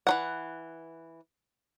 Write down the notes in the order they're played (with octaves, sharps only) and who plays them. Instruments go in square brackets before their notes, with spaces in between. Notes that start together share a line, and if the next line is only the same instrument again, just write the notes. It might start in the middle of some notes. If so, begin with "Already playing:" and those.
[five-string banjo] E3 F#3 F#5